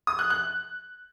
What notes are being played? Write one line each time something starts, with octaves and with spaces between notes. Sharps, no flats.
D#6
F#6
F#6